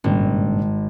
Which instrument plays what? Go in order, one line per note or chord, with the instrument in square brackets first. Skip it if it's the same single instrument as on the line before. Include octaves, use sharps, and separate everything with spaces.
[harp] G#1 [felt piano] G2 A#2 C#3